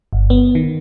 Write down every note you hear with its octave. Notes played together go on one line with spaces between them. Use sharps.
G1
B3
D#3